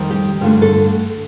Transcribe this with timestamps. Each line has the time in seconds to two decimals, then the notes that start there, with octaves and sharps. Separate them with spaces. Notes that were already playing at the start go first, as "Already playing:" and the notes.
Already playing: F2 D#3 G3 C4
0.11 G4
0.41 G2 D3 A3 F4
0.62 A4